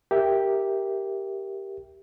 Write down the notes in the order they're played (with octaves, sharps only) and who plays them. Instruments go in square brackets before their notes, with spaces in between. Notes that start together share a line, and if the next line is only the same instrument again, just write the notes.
[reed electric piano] G4 A#4 E5